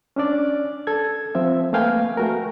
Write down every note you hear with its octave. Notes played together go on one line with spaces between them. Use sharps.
C#4 D4 D5
A4 G#6
F3 C4 E5
A3 A#3 B4 F5 G5 G#5
A3 F#4 A#4